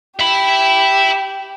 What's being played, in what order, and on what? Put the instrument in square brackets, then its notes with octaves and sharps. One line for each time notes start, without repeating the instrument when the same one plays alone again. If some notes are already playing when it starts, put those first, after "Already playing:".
[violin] G4 [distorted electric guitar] E5 B5